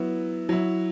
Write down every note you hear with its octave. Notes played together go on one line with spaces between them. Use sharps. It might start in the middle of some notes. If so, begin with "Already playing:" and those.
Already playing: F#3 B3 E4
F#3 E4